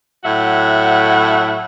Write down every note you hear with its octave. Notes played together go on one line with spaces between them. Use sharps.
A2 F#3 E5 F#5